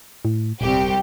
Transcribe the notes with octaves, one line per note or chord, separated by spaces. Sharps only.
A2
D#1 C2 G4